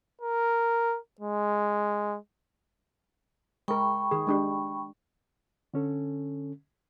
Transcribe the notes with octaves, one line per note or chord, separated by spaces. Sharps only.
A#4
G#3
G#3 A#4 G5 B5 C#6
D#3 G#4
G#3 D4 G4
D3 C#4 A4